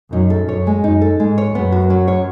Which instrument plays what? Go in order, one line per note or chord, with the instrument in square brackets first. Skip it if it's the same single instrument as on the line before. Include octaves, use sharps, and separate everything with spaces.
[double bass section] F#2 [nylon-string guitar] D#4
[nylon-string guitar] A4
[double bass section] F#2 [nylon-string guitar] C#5
[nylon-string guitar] G#3
[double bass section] F#2 [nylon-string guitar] D#4
[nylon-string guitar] A4
[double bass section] G#2 [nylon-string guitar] G#3
[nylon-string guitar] C#5
[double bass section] F#2 [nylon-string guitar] B3
[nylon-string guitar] F#4
F#3
C#5